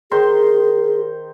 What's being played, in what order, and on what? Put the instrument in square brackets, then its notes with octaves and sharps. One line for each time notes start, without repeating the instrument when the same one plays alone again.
[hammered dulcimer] D#3 C5 C6 [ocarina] G#4